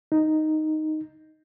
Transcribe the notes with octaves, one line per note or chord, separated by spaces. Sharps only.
D#4